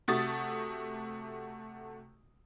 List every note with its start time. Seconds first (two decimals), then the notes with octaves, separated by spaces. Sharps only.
0.08 C3 A3 F#4 D#6 A6